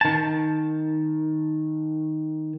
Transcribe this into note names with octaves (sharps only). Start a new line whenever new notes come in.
D#3 A5